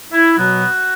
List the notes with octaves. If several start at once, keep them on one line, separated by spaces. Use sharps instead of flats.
E4
B2 F#3 B3 F#4